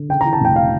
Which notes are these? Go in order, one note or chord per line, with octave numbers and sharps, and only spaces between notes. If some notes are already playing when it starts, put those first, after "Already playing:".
Already playing: D3
C#3 G5
E3 A#5
A5
F1 G5
F5